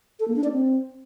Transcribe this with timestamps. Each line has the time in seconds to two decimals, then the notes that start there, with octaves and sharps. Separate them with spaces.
0.20 A4
0.28 A#3
0.36 D4
0.44 D5
0.52 C4